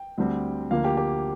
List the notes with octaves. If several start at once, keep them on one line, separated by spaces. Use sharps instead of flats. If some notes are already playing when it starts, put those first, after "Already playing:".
Already playing: G5
D2 D3 G3 C4
D2 D3 F3 A#3 F5
G4
G4